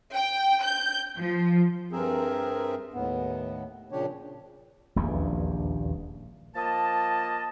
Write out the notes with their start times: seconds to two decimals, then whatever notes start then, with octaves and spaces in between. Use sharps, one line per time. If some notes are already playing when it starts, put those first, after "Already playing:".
0.15 G5
0.64 G6
1.18 F3
1.92 G2 C4 G#4 A#4 E5
2.94 D#2 A2 B3
3.92 A#2 C#3 F3 D4 G4 C#5
4.96 D#1 A#1 E2 G2
6.55 F3 A#3 A#4 D#5 A5